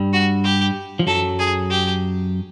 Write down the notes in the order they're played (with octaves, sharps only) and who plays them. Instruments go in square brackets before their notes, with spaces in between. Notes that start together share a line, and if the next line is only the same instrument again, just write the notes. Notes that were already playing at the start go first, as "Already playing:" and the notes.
Already playing: [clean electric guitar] G2 G3
[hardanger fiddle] F#4
G4
[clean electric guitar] F3
[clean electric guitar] F#2 F#3 [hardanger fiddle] A4
[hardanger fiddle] G#4
G4